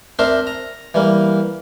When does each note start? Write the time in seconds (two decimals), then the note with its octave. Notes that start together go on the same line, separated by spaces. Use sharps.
0.19 C4 D4 A#4 E5 C6
0.47 A#5
0.94 E3 G3 A#3